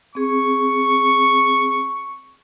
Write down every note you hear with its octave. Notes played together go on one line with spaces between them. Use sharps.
C4 G#4 C#6